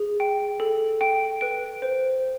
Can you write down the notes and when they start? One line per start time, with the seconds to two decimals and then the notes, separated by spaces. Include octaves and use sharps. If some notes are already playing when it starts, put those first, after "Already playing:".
Already playing: G#4
0.20 G5
0.60 A4
1.01 G5 D7
1.41 B4 D7
1.82 C5